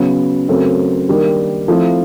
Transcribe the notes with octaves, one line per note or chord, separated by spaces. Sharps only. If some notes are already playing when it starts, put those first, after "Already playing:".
Already playing: C#3 F#3 B3
F#2 C#3 F#3 A3 C4
D#3 G3 A#3 D4
F3 A3 C4 E4